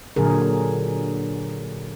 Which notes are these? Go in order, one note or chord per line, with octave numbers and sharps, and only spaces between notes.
A#2 D3 F#3 G#4 A#4